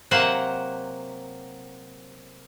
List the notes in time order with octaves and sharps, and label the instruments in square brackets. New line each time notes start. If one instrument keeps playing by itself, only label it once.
[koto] C3 F#3 A#3 C5 F#5